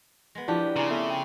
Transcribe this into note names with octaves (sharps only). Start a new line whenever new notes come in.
G#3 B3
F3 D4 E4 F4 G4 A5
C#3 C4 E4 D5 F5 G#5 A#5
A3 B3
G5